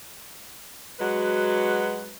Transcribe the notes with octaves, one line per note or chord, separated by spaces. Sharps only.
F#3 G#3 F#4 B4